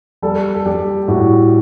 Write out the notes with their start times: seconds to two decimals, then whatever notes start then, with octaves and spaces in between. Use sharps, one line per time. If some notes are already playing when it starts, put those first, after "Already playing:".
0.22 G3 A4
0.54 A4
0.66 G3 G4
1.08 A2 F#4